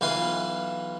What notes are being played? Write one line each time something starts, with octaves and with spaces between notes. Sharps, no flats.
B1 E3 F4 B4 G#5 C6